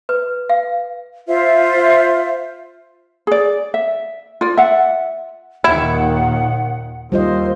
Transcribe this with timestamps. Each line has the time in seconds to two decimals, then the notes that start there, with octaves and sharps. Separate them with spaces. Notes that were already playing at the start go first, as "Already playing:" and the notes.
0.09 B4
0.49 F5
1.28 F4 C5 E5
3.27 G#4 D5
3.74 E5
4.41 F4 D5
4.57 E5 F#5
5.64 D#2 A#2 D#3 E4 F#5
7.12 D#2 G3 F4 C5 D#5